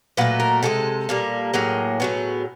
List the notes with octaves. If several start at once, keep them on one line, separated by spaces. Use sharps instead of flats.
A#2 F#3 A3 B4
A#4
C3 F3 G#3 A4
A#2 G3 A#3
A2 F#3 A#3 G#4
A2 F#3 B3